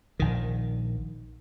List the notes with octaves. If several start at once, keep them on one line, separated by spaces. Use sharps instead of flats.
A#1 D#3